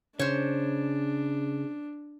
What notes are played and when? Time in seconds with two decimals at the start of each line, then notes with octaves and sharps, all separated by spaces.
0.19 C#3 D4 C5 C#5